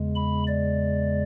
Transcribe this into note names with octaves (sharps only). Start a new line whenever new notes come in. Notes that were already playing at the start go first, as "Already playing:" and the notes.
Already playing: E2 C#3 G#3
B5
D5